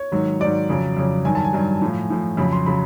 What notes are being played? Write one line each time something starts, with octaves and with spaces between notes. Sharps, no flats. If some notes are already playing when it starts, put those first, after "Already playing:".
Already playing: C#5
G#2 D#3 F#3
G#2 D#3 F#3 D5
F2 C#3 F#3
F2 C#3 F#3
G2 D#3 F#3 G#5
A5
G#5
G2 D#3 F#3
A2 F3
A2 F3
F2 C#3 F#3 B5
C6
C#3 F#3 B5